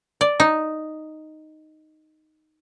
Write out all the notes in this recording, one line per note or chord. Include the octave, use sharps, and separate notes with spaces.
D5
D#4